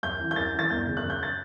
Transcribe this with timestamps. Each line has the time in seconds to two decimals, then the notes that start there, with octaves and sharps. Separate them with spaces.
0.03 F#2 G6
0.20 E3
0.31 G6
0.36 F#2 A6
0.54 E3 A6
0.70 G1 G6
0.87 C#3
0.97 F#6
1.03 F#2
1.10 G6
1.23 A6